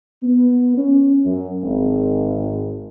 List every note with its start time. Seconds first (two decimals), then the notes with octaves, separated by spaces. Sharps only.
0.23 B3
0.77 C#4
1.23 F#2
1.63 G#1